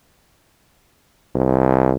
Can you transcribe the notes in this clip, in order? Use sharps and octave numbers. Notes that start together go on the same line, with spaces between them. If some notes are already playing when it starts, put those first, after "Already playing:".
C2